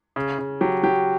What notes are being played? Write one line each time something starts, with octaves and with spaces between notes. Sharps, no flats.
C#3
C#3
F#3 G4
F#3 G4